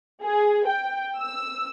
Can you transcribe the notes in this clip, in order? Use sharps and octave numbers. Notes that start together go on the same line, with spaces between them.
G#4
G5
E6